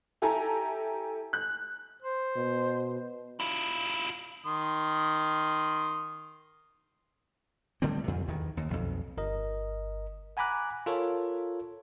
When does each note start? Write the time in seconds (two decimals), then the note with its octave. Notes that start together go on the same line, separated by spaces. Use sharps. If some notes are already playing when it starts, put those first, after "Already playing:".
0.22 E4 G4 A4 G#5 A#5
1.33 F#6
2.02 C5
2.36 B2
3.40 E4 F4
4.46 D#3 C6 D#6
7.82 D3 G3 A3 C4
8.04 F2 C3
8.28 E2 D#3 E3
8.57 D#2
8.70 B1 F2
9.17 G1 A#4 D#5
10.37 F#5 G#5 A#5 B5 D6 F#6
10.86 F4 A4 A#4 C#5